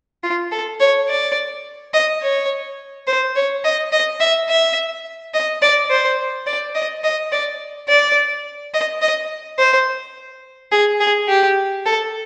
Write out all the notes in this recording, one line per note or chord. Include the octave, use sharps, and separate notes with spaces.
F4
A4
C#5
D5
D#5
C#5
C5
C#5
D#5
D#5
E5
E5
D#5
D5
C5
D5
D#5
D#5
D5
D5
D#5
D#5
C5
G#4
G#4
G4
A4